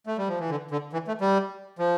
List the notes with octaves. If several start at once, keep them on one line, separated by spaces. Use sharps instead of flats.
A3
G3
F3
E3
D3
D3
E3
A3
G3
F3